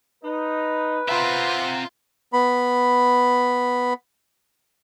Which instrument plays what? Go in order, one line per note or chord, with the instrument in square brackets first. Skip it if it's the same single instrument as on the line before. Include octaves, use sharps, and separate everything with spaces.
[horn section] D#4 [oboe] B4
[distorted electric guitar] C4 E5 [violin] F4 [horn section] C5 F#5 A#5
[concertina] B3 B5